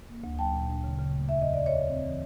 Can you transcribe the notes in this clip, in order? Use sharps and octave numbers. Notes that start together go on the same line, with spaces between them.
A#3
D2
F#3 G5 A5
A#2
D4
C#3
C#3
A3
E2 E5
E2 D#5
D5
E2
C#5 D#5
C#3
C4
E3